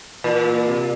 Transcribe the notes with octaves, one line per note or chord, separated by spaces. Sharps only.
A#2 E3
A#3
C3